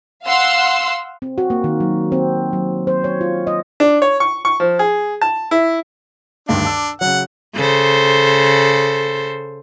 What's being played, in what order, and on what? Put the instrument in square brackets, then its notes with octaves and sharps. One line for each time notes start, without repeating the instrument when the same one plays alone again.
[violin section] F5 F#5 C6 E6
[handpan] C4
F#4
A#3
D#3
F#3
C4
F#3
C5
C#5
F4
D#5
[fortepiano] D4
C#5
C#6
C#6
F3
G#4
A5
E4
[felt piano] D2 G2 D#3 [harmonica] D4
[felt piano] A5 D6 E6
[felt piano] C#3 F#3 [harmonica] F#5
[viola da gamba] C#3 A4 C5